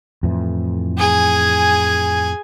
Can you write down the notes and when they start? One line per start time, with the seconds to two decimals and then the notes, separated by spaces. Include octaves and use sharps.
0.23 F2 A2 E3
0.98 G#4 G#5